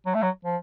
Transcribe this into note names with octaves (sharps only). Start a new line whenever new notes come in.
F#3
A3
F#3
F3